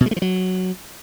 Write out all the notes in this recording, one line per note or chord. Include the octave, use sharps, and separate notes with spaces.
B2
G#3
A3
F3
F#3